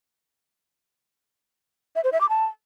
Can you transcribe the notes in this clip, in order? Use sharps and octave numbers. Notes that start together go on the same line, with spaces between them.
E5
C5
E5
D6
A5